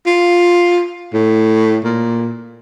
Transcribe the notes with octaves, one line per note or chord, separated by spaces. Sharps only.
F4
A2
A#2